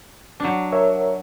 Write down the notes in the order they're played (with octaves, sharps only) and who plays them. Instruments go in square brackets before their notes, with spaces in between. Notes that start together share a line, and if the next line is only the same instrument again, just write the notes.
[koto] F#3 D4
[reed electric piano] A#4 C#5 E5